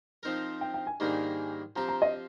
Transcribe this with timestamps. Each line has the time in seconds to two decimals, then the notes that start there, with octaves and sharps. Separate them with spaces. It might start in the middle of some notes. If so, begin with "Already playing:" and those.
0.23 F3 C4 D#4 A#4
0.61 G5
0.74 G5
0.87 G#5
1.00 G#2 D#3 G3 A#3 D4
1.76 F3 C4 G4 A#5
1.88 A#5
2.02 D#5